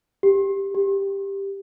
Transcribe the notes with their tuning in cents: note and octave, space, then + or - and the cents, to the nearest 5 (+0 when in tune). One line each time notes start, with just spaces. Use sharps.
G4 +5
G4 +10